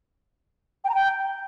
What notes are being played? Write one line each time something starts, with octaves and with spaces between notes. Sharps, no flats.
G5
A#5
G5